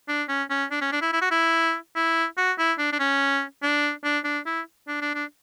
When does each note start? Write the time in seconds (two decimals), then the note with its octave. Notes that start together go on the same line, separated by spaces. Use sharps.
0.08 D4
0.28 C#4
0.50 C#4
0.71 D4
0.81 C#4
0.92 D4
1.02 E4
1.13 E4
1.22 F#4
1.31 E4
1.96 E4
2.37 F#4
2.58 E4
2.78 D4
2.92 D4
2.99 C#4
3.63 D4
4.04 D4
4.24 D4
4.46 E4
4.88 D4
5.02 D4
5.15 D4